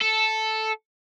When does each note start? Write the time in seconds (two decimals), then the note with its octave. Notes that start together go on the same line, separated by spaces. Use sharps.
0.02 A4